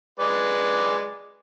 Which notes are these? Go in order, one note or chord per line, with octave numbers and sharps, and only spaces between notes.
G#3 B4 D5